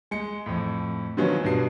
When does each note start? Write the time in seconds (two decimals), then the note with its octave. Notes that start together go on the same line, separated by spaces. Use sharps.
0.11 G#3 C#7
0.46 F2 A2
1.17 D3 D#3 F3 F#3 B3 C#4
1.43 G2 B2 C7